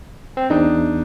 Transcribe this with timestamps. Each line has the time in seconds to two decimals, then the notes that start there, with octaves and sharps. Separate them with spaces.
0.37 C4
0.50 E2 D4 D#4